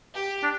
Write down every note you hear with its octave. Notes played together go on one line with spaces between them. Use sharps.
G4
D4